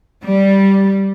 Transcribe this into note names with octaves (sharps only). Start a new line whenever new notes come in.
G3